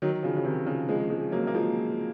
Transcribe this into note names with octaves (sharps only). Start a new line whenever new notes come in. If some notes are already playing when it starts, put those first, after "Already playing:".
D#3 F#3
C#3 F3
C#3
C3 D#3
C#3 F3
F3 G#3
F3 G#3
F#3 A#3
A#3
F3 G#3